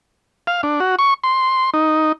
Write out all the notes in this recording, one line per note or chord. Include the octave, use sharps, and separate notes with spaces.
F5
D4
F#4
C#6
C6
D#4